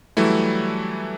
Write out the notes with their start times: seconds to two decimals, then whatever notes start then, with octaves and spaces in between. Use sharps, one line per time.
0.17 E3 F#3 G3 A3 E4